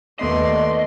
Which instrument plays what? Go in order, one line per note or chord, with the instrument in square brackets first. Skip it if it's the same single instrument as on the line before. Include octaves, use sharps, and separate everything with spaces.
[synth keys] D#2 B3 C7 [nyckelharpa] A3 [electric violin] D5 C6 [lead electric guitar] D#5